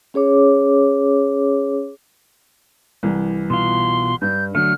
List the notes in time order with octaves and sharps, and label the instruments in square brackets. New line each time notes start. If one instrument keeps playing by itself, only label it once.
[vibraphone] C#4 G#4 C#5 D6
[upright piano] C2 E3
[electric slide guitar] B2 F4 [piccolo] C6
[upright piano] G2 [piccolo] G6
[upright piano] D3 [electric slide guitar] F#3 A3 [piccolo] F6